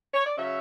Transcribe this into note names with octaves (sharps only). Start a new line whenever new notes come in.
C#5
D5
C#3 F#3 C#4 E5